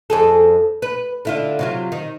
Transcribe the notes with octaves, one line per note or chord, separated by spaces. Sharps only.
F2 G#4 A4
B4
D3 E4 F4
C3 F#3 F4
D#3